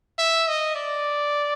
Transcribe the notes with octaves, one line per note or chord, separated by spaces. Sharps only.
E5
D#5
D5